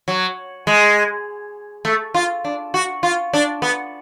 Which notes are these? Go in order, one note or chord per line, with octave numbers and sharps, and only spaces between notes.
F#3
G#3
A3
F4
D4
F#4
F4
D4
B3